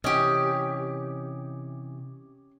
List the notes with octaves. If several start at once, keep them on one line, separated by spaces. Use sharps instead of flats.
C3 E3 C#4 G4 D#5